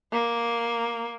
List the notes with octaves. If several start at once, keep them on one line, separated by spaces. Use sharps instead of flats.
A#3